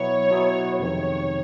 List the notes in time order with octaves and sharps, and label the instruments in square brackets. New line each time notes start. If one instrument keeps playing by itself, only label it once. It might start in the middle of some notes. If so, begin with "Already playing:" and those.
Already playing: [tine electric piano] B2 F#3 B3 E4 [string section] C#5
[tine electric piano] B2 F#3 B3 E4
[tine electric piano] F2 C3 D#3 G#3 [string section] C#5